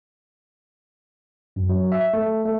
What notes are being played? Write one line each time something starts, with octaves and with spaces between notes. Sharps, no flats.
F#2
F#3
E5
A3
A3